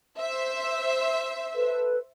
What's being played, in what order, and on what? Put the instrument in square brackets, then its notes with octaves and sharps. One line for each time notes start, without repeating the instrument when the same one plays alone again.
[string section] C5 E5
[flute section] A4 B4